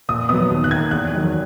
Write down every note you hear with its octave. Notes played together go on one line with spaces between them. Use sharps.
A#2 D#6
F#3 B3 D#6
D#2
F#6
D#3 A#3 G#6
E2 F#6
D#3 F#3